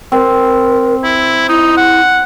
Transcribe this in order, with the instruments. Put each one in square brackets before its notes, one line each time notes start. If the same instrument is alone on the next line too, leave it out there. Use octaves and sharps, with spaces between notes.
[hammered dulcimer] C4 [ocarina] A#4
[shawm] E4
[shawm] D#4 [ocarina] E4
[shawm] F#5